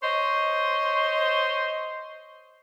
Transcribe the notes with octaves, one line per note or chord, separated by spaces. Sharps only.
C5 C#5 D#5